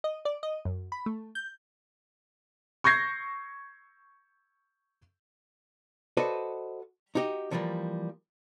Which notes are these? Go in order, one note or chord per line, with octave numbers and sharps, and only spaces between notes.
D#5
D5
D#5
F#2
B5
A3
G6
C#6 G6 G#6 A#6 C7
F#4 A4 B4 C5 D5 D#5
D#4 F#4 G4 D#5
D3 E3 F3 G3 A#3